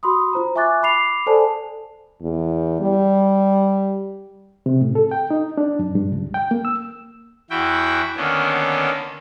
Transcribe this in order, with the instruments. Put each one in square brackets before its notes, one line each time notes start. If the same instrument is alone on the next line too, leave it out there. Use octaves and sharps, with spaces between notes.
[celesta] F#4 B5 C6 D#6
F4 C5 A#5
E5 G#5 C#6 D6 F#6 A6
B5 D6 C7 F7
A4 C5 D5 G#5 A5
[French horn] E2
G3
[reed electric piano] C3
A2
A4
G5
D#4
D4
F#2
G2
C#2
G5
A#3
E6
[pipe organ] E2 E3 E4 F#4 G5
D3 D#3 A#3 B3 C#4